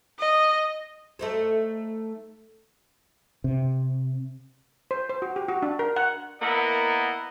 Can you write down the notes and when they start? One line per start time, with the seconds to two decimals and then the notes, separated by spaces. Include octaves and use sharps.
0.19 D#5
1.19 A3 D#4 C5
3.44 C3
4.91 C5
5.09 C5
5.22 F#4
5.36 G4
5.48 F#4
5.62 D4
5.79 A#4
5.96 F#5
6.41 A#3 B3 E4 A#4 D#5 F#5